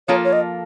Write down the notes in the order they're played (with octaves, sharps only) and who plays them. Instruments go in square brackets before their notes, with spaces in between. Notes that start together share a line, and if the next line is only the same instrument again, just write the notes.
[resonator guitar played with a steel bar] F3 A#3 F4 A4 [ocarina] C#5
[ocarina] C#5
D#5